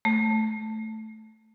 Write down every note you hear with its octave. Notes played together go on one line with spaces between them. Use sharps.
A3